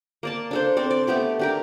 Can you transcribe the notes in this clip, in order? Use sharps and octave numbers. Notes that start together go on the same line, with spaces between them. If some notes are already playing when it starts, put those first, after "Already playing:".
A#3 D5 A5
D4 A4 C5
C4 A4 D5
D5
A3 B3 G4 D6
D4 G4 A#4